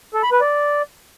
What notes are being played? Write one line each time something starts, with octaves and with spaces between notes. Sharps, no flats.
A4
B5
B4
D5